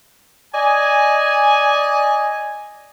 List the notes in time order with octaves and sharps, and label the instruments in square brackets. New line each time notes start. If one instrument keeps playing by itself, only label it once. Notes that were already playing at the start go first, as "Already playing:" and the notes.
[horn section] D5 D#5 G#5